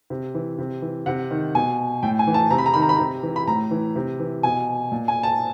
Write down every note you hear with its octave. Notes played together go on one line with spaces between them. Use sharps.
C3
E3
C3
E3
C3 F#5
D#3
B2 G#5
A2 G5
G#5
E3
A5
C3 A#5
B5
A#5
D#3 B5
A#5
B5
C3 A#5
E3
B5
A2 A#5
E3
C3
E3
B2 G#5
A#2
G#5
A5